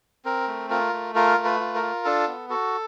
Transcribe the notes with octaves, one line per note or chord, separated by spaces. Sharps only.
C4 A#4
A3
F4 A#4
A3
F4 A#4
A3
B4
F4
A#4
F4
D4 A4
B3
F#4 A4